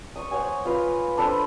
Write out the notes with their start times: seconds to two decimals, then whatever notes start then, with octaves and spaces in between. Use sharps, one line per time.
0.16 C#6 D#6
0.31 C5 C#5 F#5 G#5
0.65 F4 B4 F5
1.17 D4 A4 B4 C5